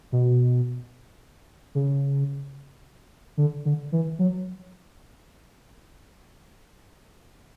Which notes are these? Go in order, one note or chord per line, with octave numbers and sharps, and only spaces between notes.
B2
C#3
D3
D3
E3
F#3